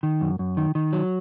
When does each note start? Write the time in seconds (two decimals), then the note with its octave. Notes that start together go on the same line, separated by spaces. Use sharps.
0.03 D#3
0.21 F#2
0.39 F#2
0.57 D#3
0.75 D#3
0.93 F#3